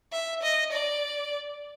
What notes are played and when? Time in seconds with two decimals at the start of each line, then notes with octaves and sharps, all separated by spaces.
0.12 E5
0.42 D#5
0.72 D5